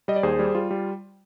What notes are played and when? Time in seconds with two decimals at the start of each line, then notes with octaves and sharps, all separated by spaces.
0.08 G3 D#5
0.16 D5
0.23 D#2 G#4 C5
0.39 G3
0.55 G3 F4
0.71 G3